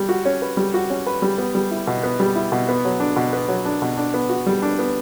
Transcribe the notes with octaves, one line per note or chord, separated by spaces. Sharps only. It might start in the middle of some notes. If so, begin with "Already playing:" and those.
Already playing: G3
F#4
C#4
B4
G3
F#4
C#4
B4
G3
B3
G3
E4
B2
B3
G3
E4
B2
B3
F#3
D4
B2
B3
F#3
D4
B2
D4
B3
F#4
G3
D4
B3